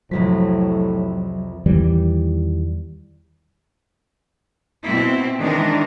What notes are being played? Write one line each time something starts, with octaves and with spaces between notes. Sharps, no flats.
C2 F2 A2 F3 F#3 B6
E2 D#3 E3 G3
B2 C4 E4
D#3 E3 G#3 D4 A#4